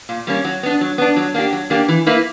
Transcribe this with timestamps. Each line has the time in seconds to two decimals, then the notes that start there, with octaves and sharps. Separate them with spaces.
0.09 A#2
0.27 G3 A#3 C#4
0.44 F#3
0.63 B3 D4
0.81 F#3
0.98 B3 D4
1.16 F#3
1.34 A#3 D4 G4
1.53 F#3
1.70 A#3 D4 G4
1.88 E3
2.07 A#3 E4 B4